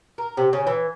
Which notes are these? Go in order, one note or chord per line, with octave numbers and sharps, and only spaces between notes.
A#4
C3
C#3
E3